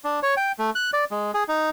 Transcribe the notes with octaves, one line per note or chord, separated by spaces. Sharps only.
D4
C#5
G5
A3
F#6
D5
G#3
G#4
D#4